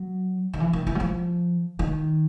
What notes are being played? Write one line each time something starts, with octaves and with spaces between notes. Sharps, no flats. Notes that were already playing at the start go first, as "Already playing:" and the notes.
Already playing: F#3
D#3
E3
D#3
E3
F#3
F3
D#3